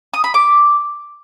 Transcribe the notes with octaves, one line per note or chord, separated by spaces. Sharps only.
D#6
B5
D6